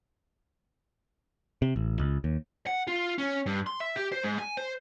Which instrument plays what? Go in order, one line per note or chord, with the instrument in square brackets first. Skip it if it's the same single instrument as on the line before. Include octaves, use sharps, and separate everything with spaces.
[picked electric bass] C3
A1
C#2
D#2
[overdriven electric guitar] F#5
F4
C#4
G2
C6
E5
G4
C5
G#2
G#5
C5